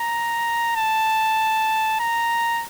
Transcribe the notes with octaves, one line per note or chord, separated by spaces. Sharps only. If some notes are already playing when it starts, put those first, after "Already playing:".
Already playing: A#5
A5
A#5